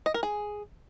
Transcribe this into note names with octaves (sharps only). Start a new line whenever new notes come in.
D#5
A#4
G#4